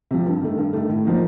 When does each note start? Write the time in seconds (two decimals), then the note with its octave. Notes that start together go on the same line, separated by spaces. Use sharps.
0.11 C3 F3
0.26 G2
0.42 D#3 A3
0.58 G2
0.73 D#3 A3
0.89 A2
1.05 F3 A#3 D#4